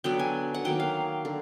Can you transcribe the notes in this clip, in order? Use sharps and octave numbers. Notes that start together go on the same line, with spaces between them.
D3 F#3 B3 G5
G#5
F#5
D#3 F#3 A#3 G5
F5
D3